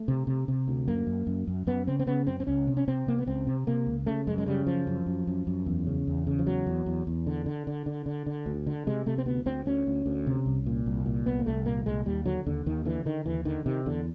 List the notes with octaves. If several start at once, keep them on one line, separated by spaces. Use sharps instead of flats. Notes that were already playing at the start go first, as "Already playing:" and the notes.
Already playing: A3
C3
C3
C3
D2
F#2 A#3
F#2
F#2
F#2
F#2 B3
C#3 C4
C4
C#3 B3
F#2 C4
C4
C#2 C#4
C3
C#4
C3 C4
C3 A#3
B3
C#2 C4
C3
C3 A#3
C#2
C#3 A3
F#2 G#3
G#3
C#3 G3
F#2 F3
F#2
F#2
F#2
F#2
E2
C#3
E2
C#3
F3
E2 F#3
E2
E2
E2
D3
D3
D3
D3
D3
D3
D2
D3
C3 G#3
C3 A3
C4
D2 B3
D2 C4
D2 C#4
D2
D2
C3
C2
A#2
C2
A#2
C2 B3
A#3
C2 A3
A#2 A#3
C2 G#3
D#2 G3
D3 F#3
D#2 D3
D#2 D#3
D3 E3
D3 D#3
D#2 E3
D3 D#3
C3 D#3
E2 D3